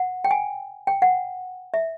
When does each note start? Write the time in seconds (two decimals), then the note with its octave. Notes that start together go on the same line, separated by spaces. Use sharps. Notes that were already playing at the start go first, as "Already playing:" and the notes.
Already playing: F#5
0.24 G5
0.31 G#5
0.87 G5
1.02 F#5
1.74 E5